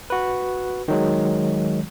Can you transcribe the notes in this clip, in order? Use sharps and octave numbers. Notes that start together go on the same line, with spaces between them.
F#4 B4
D#3 F#3 G#3